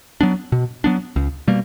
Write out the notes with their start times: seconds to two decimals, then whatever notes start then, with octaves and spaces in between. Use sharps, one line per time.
0.21 F#3 B3 D4
0.52 B2
0.84 F#3 B3 D4
1.16 C#2
1.48 B2 G3 A#3